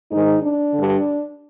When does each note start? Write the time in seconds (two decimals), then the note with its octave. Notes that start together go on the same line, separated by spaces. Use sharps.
0.11 G#2 D#3 D#4
0.43 D4
0.73 D3
0.78 G2